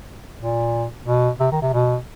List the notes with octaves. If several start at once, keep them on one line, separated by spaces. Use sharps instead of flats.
A#2
B2
C3
D#3
C3
B2